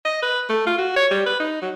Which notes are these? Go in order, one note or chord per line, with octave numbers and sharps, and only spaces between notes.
D#5
B4
A3
F4
F#4
C#5
G3
B4
D#4
F#3